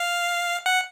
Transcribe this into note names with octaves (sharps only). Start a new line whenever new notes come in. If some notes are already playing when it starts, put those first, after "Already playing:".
Already playing: F5
F#5